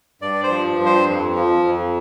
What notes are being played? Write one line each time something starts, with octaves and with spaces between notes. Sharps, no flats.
G2 D5
C5
F3
G2
C5
F2
F3
F2